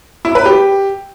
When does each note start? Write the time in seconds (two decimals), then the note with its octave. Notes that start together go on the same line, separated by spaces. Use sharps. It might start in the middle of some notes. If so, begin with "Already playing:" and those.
0.25 E4
0.35 B4
0.46 G4